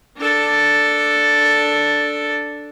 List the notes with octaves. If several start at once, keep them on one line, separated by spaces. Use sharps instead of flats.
D4 A4